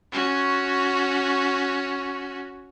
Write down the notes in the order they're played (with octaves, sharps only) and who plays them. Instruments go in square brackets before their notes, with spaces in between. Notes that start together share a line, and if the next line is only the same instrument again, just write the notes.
[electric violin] C#4 F#4